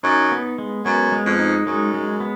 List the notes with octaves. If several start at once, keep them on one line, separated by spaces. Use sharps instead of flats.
F#2 D#4
B3
G#3
F#2 B3
G#3
F2
D#4
F#2 G#3
G#3
B3